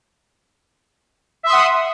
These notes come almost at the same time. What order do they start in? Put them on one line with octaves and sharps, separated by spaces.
E5 C6 D#6 F#5